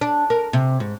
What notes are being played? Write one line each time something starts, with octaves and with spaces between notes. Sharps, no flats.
D4
A#4
C3
G#2